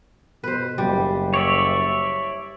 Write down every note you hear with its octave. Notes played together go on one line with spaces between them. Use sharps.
B2 B4 C5
F#1 G3
C#5 D5 E5